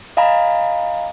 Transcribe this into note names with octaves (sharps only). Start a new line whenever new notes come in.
D#5 F5 G#5 A#5 B5